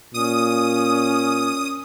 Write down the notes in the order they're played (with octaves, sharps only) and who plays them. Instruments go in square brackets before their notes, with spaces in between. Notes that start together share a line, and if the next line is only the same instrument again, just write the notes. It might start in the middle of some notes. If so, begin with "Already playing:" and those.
[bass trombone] A#2 [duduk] C#4 [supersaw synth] D#6